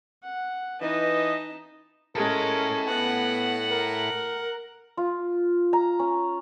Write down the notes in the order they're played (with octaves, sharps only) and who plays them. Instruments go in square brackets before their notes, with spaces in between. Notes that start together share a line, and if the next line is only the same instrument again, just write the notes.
[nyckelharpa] F#5
[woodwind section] E3 B4 D#5 [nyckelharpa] D#4 A5
[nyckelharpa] G#3 C#4 [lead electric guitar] E4 A4 [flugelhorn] A#4
[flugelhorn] B3 [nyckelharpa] F#5
[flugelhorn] A#4
[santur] F4
A#5
C#4